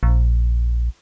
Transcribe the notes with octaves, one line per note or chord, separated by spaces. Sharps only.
A#1